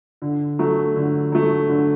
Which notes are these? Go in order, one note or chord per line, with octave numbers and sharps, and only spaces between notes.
D3
F#3 A3
D3
F#3 A3
D3